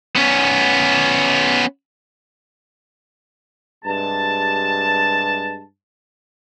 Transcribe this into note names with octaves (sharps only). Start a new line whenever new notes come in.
B3 C#4
G2 C3 G#3 A5